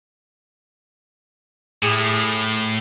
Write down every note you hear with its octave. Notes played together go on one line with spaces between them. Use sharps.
A2 E4 G4 G#4